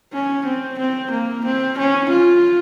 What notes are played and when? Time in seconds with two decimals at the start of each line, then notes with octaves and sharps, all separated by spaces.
0.12 C#4
0.45 C4
0.79 C4
1.11 A#3
1.45 C4
1.77 C#4
2.09 F4